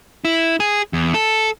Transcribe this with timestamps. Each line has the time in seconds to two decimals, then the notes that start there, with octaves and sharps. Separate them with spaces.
0.25 E4
0.60 G#4
0.93 E2
1.14 A4